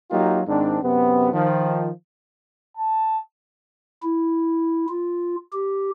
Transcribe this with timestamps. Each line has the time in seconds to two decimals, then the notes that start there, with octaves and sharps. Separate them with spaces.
0.10 F#3 A#3 D#4 F4 G4
0.47 G#2 D#3 C4 D4
0.82 F#2 C3 B3
1.33 D#3 F3
2.77 A5
4.03 E4
4.89 F4
5.53 G4